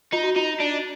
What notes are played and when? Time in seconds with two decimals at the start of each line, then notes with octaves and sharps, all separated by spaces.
0.13 D#4 F4
0.23 F#4
0.36 D#4 F4
0.60 D4